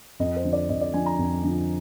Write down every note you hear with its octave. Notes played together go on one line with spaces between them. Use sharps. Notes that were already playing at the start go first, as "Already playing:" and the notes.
F2 D#5
C5
D3 F3
D5
F2 D#5
D5
D3 F3 G#5
A#5
F2
D3 F3